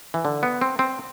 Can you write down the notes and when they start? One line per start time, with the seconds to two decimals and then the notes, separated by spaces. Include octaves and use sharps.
0.14 E3
0.25 D3
0.43 B3
0.61 C4
0.79 C4